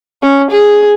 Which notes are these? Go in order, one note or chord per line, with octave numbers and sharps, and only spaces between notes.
C#4
G#4